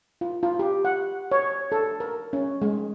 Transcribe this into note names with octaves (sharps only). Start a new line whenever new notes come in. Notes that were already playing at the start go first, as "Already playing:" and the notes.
F4
F4
G4
F#5
C#5
A4
A#4
C#4
G#3